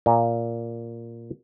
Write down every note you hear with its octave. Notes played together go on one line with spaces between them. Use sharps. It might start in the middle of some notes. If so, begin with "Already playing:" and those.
A#2